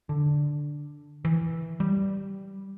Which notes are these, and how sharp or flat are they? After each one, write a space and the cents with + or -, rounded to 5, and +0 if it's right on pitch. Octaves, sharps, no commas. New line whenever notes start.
D3 +0
E3 -10
G3 -5